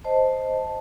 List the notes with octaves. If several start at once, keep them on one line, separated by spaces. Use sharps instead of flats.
C5 D#5 A5